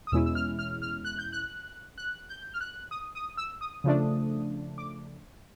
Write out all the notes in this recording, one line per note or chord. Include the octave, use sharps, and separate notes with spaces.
D#6
E2 B2 G#3 C#4 E4 E6
E6
F6
F6
F6
F#6
G6
F#6
F#6
G6
F6
F#6
D#6
D#6
E6
D#6
C#3 F3 A3 D4
D6